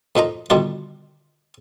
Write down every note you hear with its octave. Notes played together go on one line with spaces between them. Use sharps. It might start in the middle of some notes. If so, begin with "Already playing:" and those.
F2 A#2 D#4 A#5
B2 D3 D#3 G3 F4